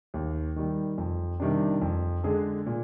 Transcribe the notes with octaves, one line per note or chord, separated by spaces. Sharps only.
D#2
D#3 G3
F2
C3 D#3 G3 D4
F2
D3 G#3 D4 G#4
A#2